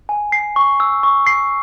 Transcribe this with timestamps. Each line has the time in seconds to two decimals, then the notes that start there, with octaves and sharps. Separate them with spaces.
0.09 G#5
0.32 C7
0.56 C#6
0.80 E6
1.03 C#6
1.27 C7